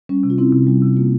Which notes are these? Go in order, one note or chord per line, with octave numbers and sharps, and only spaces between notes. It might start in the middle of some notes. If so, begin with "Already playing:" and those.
G3 C#4
C3
F4
C4 E4
C3
G3
C3
A#3 F4